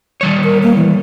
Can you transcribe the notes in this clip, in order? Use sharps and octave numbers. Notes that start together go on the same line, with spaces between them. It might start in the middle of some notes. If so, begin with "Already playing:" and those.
D#3 G3 C#5
A#4
A#3
E3